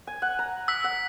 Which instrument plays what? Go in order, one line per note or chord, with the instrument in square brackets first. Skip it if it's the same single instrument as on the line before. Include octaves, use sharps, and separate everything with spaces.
[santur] G#5
F#5
A#5
[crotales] E6 B6
[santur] F#5